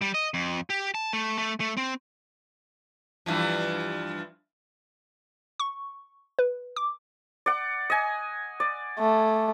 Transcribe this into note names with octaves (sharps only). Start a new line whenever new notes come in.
G3
D#5
F2
G4
A5
A3
A3
A3
C4
G2 E3 F3
C#6
B4
D6
D5 F#5
D#5 G#5
D5
A3